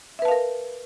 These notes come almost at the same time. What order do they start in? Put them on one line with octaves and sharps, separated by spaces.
E5 B4 A5 F5 A#4